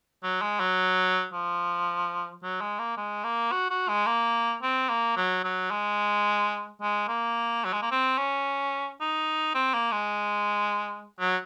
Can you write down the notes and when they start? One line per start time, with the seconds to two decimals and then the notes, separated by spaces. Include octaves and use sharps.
0.23 F#3
0.42 G#3
0.60 F#3
1.33 F3
2.43 F#3
2.61 G#3
2.79 A#3
2.97 G#3
3.24 A#3
3.52 F#4
3.70 F#4
3.89 G#3
4.06 A#3
4.62 C4
4.89 A#3
5.17 F#3
5.44 F#3
5.71 G#3
6.81 G#3
7.08 A#3
7.65 F#3
7.73 G#3
7.82 A#3
7.91 C4
8.18 C#4
9.01 D#4
9.55 C4
9.74 A#3
9.92 G#3
11.20 F#3